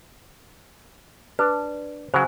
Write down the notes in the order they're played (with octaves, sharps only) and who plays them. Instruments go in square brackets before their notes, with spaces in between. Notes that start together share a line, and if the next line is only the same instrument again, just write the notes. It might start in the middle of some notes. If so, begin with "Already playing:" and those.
[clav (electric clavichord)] D4 [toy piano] B4
[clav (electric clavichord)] C#3 F#3 [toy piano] C5 G#5